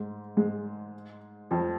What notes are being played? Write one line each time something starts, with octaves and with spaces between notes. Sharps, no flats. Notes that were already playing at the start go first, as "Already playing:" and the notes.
Already playing: G#2 G#3
G#2 G#3
F2 F3